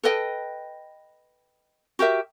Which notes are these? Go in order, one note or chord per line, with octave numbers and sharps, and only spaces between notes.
A4 B4 D#5 G5
F#4 G4 A#4 E5